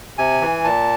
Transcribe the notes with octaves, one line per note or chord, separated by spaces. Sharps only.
C3 G#5
E3
A#2 A5